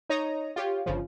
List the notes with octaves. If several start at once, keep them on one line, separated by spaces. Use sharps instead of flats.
D#4 C#5 A#5 D#6
F4 G4 C#5
G1 C#3 F3